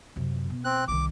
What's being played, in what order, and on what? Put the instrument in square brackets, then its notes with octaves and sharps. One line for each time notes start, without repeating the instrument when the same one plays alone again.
[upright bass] F#2 C3
B2
[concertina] C4 F#6
[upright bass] C2 D#3 [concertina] D6